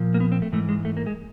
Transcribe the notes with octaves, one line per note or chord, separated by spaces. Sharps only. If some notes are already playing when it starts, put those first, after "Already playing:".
Already playing: A#2 F3
A#3
B3
C4
A3
G#2 E3 A3
G#3
A3
A#3
G#3